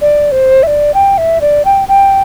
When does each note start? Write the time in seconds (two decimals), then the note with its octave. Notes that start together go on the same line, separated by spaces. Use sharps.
0.01 D5
0.32 C5
0.63 E5
0.67 D5
0.94 G5
1.18 E5
1.41 D5
1.65 G5
1.88 G5